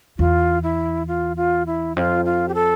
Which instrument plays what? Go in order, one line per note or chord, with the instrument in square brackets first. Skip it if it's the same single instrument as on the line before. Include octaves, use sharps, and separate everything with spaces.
[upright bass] E2 [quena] F4
[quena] E4
F4
F4
E4
[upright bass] F2 [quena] F4
[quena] F4
G4
A4